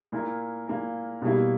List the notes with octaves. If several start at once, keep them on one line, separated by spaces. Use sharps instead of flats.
A#2 A#3 E4 A#4
A#2 A#3 E4 A#4
B2 G3 A#3 E4